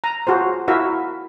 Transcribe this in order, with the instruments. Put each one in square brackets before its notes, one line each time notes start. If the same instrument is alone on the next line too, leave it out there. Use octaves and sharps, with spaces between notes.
[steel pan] A#5
F4 F#4 G#4 C5
E4 F#4 A#4 E5 F5